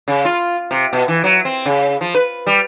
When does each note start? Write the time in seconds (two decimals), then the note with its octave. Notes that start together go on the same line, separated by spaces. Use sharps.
0.08 C#3
0.25 F4
0.71 C3
0.93 B2
1.08 E3
1.24 F#3
1.45 C4
1.66 C#3
2.01 F3
2.15 B4
2.47 G3